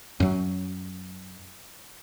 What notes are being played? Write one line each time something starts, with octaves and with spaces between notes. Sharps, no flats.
F#2 F#3